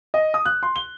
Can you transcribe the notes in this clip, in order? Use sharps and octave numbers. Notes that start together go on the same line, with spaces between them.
D#5
D#6
F#6
C6
G7